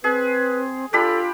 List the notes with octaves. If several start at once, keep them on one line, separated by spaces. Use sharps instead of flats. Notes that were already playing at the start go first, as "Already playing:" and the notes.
C4 G#4 B4
D4 F4 G4 A4 B5